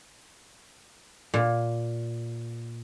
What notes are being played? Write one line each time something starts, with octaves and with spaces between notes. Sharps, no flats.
A#2